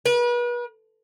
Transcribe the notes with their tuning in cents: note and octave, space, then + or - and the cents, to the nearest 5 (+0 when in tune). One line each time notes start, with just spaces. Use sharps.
B4 -40